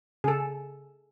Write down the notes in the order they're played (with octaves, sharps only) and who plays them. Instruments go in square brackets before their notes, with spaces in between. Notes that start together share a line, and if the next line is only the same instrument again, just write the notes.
[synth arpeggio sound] C#3 [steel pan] G#4 A4